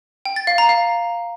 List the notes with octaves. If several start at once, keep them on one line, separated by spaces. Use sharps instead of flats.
G5
A6
F5
A#5
F5